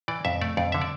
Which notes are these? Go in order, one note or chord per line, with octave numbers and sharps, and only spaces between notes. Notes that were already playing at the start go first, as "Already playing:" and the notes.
E3 D5
F2 E5
A3 D5
F2 D5
D3 E5
D5